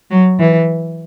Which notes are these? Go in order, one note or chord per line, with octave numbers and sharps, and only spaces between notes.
F#3
E3